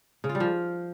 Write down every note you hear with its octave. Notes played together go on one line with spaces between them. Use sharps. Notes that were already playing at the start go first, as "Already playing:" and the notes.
C#3
F4
G3
F3